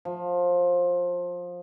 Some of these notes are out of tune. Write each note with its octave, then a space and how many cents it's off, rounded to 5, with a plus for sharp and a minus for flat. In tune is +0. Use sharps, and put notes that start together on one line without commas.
F3 +20